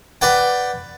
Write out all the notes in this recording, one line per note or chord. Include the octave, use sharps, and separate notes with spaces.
B4 D5 F#5 G5